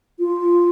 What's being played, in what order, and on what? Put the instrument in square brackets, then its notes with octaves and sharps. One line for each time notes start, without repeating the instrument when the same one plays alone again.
[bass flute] F4